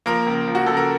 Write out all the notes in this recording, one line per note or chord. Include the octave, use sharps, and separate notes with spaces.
F3 A#3 A#4
C#2
F3
F#4
C#2 A4
A#4